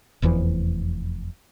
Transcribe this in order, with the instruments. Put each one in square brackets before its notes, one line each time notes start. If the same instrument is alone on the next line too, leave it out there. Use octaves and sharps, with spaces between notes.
[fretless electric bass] F1 E2 E3 F3